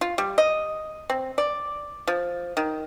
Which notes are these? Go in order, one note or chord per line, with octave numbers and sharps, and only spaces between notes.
F4
G3
D#5
C4
D5
F3
D#3